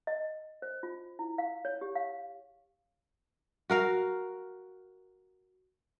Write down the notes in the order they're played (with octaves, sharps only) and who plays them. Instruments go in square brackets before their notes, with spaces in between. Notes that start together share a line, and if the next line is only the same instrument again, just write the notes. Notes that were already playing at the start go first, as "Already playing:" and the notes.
[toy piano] D#5
C5
F4
E4
F5
C#5
G4
F5
[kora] F#4 A#4 F5